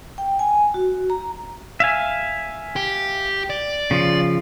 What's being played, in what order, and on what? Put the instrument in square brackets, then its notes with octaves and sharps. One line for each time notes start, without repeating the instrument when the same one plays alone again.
[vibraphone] G5
G#5
F#4
A#5
[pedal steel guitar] E5 F5 G#5
[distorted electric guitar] G4
D5
[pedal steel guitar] C#3 F3